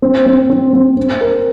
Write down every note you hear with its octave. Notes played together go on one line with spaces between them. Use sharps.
C4
C4
C4
C4
C4
A#4